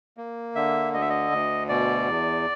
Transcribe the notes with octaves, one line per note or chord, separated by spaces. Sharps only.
A#3
D3 E5
D2 D#5
E5
D#5
D2
B2 D5
E2